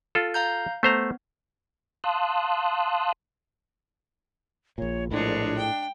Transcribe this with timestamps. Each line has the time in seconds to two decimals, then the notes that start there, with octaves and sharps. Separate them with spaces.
0.15 F4 A4
0.34 F5 A#5 G6
0.83 A3 B3 C5 A#5
2.04 F5 A5 C6 D#6 E6 F#6
4.78 A#1 A#2 C#5
5.11 A#1 A2 G#3 D4 C#5
5.57 G5